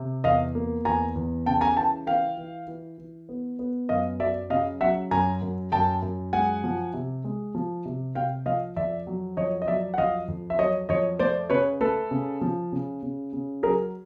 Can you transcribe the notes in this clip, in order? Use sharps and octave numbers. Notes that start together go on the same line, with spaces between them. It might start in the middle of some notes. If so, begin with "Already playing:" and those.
Already playing: C3
E2 D#5 F5
A#3
E2 G#5 A#5
E2
C#3 G5 A5
G#5 A#5
E3 G5 A5
E3 F5 G5
E3
E3
E3
B3
B3
F#2 D#5 F5
F#3 D5 E5
C#3 D#5 F5
F#3 E5 F#5
F#2 G#5 A#5
F#2
F#2 G5 A5
F#2
G#3 F#5 G#5
F3
C3
G#3
F3
C3
C3 F5 G5
F3 D#5 F5
F2 D5 E5
F#3
F2 C#5 D#5
D#5
F#3 D5 E5
F#5
F2 D#5 F5
F2
E5
F#3 C#5 D#5
F2 C#5 D#5
A3 C5 D5
C#3 B4 C#5
A3 A4 B4
C#3
F3
C#3
C#3
C#3
F#3 G#4 A#4